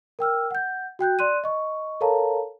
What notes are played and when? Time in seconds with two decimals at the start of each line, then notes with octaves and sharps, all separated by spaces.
0.19 A#4 G5 E6 F6
0.51 F#5 G6
0.99 F#4 G5 F#6 G6
1.19 D5 C6 F#6 D#7
1.44 D#5 C#6
2.01 A4 A#4 C#5 F5 A5 A#5